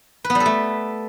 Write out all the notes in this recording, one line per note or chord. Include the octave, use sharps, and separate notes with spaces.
B4
B3
G3
A4
A3